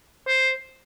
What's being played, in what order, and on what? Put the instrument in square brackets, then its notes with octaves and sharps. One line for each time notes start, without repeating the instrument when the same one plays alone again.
[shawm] C5